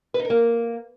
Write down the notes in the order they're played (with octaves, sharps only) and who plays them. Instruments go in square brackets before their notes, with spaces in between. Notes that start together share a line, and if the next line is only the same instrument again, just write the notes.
[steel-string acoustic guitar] B4
D#4
A#4
A#3